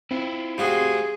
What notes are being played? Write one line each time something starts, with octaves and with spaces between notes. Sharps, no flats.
C4 E4 F4
G3 A3 F4 F#4 G#4 C5